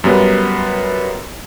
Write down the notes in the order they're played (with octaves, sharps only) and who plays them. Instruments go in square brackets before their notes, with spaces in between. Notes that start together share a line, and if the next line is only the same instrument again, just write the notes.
[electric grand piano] F#2 G3 B3